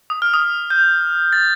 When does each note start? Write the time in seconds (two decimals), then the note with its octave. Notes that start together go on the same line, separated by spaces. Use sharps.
0.10 D#6
0.22 F6
0.34 D#6
0.70 G6
1.33 A6